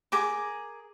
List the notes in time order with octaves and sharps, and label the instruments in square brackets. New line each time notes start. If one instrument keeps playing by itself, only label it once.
[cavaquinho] G#4 A#4 D6